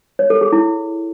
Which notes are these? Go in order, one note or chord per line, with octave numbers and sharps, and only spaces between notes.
C#5
A4
G#4
E4